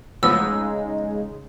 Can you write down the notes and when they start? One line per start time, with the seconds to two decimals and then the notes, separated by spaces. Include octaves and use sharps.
0.23 A2 C#3 F3 G#3 B3 D#4 E6